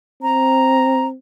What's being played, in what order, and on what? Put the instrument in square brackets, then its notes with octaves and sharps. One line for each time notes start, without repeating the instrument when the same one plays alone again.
[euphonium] C4 [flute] A#5